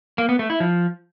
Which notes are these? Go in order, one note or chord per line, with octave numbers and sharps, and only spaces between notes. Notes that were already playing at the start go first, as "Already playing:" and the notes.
A#3
B3
A3
E4
F3